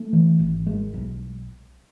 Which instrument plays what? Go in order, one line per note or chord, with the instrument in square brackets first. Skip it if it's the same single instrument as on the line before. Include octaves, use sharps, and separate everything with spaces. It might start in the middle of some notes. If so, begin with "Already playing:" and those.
Already playing: [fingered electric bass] A3
E3
G#1
G#3
B1